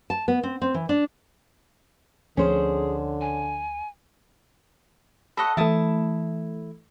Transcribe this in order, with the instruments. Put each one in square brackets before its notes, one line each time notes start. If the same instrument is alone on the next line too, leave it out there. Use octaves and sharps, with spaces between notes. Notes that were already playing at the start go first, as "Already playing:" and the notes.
[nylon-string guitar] A5
B3
C4
C4
E3
D4
[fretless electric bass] D2 F3 C4 [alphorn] D3 [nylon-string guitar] C#4 C5 [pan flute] G#4
[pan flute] G#5
[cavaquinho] A4 D#5 F#5 [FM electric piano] B5 C#6
[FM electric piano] E3 A3 [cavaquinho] E4 A5 D#6